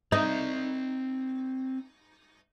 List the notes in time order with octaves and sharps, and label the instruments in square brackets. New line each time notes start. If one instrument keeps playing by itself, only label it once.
[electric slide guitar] C4 D5 [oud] D#4